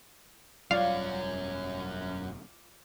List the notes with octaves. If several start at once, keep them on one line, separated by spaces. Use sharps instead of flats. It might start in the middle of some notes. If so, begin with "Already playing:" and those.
E1 F#2 F#3 G3 F4 C#5 D5 F5